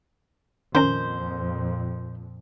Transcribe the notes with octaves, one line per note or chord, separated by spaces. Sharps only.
F2 A#2 D#3 C#4 A#4 C5